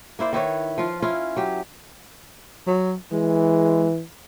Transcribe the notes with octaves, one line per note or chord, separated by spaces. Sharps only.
A#3 E4 C5 D5
D#3 E4 B4 C#5
F3 F4
C#4 E4 F4
F#3 G4
F#3
E3 G#3